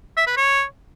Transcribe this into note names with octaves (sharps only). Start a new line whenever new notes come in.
E5
B4
C#5